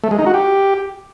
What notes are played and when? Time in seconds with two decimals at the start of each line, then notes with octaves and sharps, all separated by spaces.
0.04 A3
0.11 G#3
0.19 D#4
0.26 F#4
0.34 G4